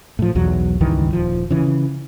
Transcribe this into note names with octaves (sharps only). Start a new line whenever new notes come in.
A2 F3
B1 E2 F#3
C#2 G2 D#3 E3
D#1 F3
C#3 E3